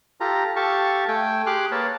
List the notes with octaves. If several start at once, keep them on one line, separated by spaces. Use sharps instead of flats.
F4 G4 A4 A#5
G4 A4 F5 A5 C#6
A3 G5 G#5
G4 G#4 C6 D6 F6 F#6
A#3 A#4 B4 C#5 A5